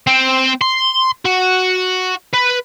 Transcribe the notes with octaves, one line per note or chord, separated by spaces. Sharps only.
C4
C6
F#4
B4